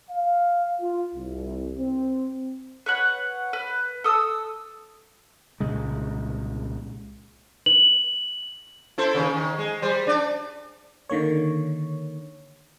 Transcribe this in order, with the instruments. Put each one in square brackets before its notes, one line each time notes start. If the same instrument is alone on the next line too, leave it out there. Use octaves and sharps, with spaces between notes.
[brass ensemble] F5
F4
C2
C4
[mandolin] B4 C#5 F#5
B4
A4 D#6 E6
[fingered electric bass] C2 A#2 C#3 G#3
[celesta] F#7
[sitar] E4 A4 C5
D#2 C#3
D#3
G#3
G3 C5
D4 D5
[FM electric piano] D3 D#3 A#3 C#5